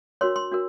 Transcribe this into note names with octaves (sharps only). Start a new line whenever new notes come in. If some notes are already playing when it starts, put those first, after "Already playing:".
D4 F#4 A#4 C#5 C6
C6
D4 F#4 A#4